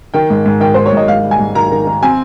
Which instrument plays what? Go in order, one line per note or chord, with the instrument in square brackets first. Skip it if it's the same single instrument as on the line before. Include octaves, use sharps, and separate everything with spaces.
[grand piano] D#3 [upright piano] G5
[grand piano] G#2
G#2
[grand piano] D#3 [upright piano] G5
[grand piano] D#3 [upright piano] C5
[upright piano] C#5
[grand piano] G#2 [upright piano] D#5
[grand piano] G#2 [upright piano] F5
[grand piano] G3
[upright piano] G#5
[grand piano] G#2
[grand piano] D#3 [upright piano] A#5
[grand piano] D#3
D#3
[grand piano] C4 [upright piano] G#5